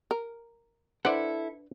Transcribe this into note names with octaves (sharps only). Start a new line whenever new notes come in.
A#4
D4 E4 A4 B4 C5 D5 F#5